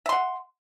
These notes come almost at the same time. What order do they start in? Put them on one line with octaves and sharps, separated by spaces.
E5 C6 F#5